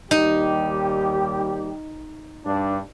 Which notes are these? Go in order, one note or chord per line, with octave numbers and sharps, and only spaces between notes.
D#2 G3 D#4 G4
G2 D4